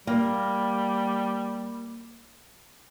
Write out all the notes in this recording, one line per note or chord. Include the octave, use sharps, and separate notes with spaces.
G3 A#3